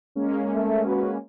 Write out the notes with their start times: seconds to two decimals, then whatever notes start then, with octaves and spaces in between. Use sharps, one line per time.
0.15 G#3 A#3 C#4
0.54 A3
0.85 F#4 B4